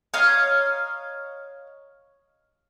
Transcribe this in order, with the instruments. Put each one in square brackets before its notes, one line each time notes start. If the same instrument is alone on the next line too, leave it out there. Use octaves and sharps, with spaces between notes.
[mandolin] C#5 D#5 F5 A#5